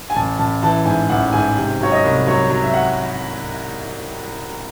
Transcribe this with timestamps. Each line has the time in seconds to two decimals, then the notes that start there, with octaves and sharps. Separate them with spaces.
0.10 G#5
0.15 A1 A5
0.39 A1 A5
0.63 E3 A5
0.85 G#2 G#5
1.09 A1 F#5
1.33 G#2 G#5
1.57 C3
1.80 F#3 C#5
1.92 D#5
2.03 C2
2.26 F#3 C#5
2.50 F#3
2.63 E5
2.74 F#5